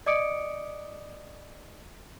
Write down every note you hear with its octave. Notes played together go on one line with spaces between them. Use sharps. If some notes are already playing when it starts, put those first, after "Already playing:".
D5 D#5 D6 D#6 C#7 D7